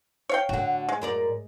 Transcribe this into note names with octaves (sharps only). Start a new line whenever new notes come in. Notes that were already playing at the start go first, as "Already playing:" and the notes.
C#5 F5 G5
A2 D3 F#4
G#3
F#2 A#4 D5